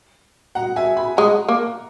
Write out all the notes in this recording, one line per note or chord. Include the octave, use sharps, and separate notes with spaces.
F#5 A#5
E5 G#5
G#5 B5
G#3 F#5 A#5
A#3